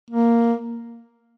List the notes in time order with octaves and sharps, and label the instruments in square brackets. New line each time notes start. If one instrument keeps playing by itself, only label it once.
[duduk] A#3